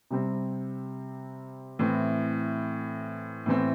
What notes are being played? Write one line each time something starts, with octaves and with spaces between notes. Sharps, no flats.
C3 G3 C4
A2 E3 C4
A2 E3 C4